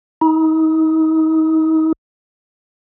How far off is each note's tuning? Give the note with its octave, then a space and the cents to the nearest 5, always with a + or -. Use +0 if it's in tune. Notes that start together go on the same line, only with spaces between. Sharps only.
D#4 +35